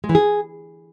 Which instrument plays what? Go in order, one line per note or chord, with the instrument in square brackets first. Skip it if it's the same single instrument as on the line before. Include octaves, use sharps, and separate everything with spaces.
[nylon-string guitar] G#3
E3
G#4